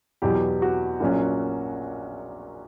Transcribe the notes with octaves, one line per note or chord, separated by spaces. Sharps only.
E2 B2 F#3 G4
F#4
A#1 A#2 F#3 C#4